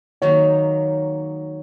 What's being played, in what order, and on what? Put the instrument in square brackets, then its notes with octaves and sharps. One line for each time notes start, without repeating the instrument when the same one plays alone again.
[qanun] D#3 F#3 A#3 D#4 [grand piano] C#5